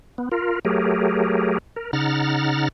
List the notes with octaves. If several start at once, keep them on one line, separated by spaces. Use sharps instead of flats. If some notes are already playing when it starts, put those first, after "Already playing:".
B3
F4 A#4
F#3 A3 G4 G#4 A#4
A#4
C#3 D#4 F#5 A#5 F6 A6